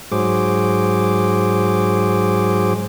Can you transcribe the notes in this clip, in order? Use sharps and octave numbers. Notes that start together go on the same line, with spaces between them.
G#2 F#3 G#4 C5 D6